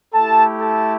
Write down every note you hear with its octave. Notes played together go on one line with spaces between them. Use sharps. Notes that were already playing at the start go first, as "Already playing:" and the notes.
A3 E4 G4 A4 A5
A4 A5